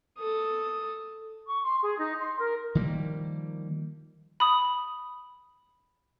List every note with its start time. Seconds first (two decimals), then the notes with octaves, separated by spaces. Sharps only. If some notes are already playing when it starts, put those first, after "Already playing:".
0.18 A4 D#6
1.46 C#6
1.62 C6
1.82 G#4
1.98 D#4
2.20 C6
2.39 A#4
2.75 D#3 F3 G3 A#3
4.40 B5 D#6